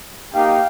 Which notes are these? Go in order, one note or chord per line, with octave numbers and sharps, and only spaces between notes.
A#3 D#4 G4 F5 G5